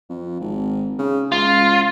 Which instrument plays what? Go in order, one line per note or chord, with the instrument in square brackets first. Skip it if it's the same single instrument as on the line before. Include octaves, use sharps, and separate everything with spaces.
[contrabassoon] F2
G#1
C#3
[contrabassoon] C#2 [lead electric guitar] F4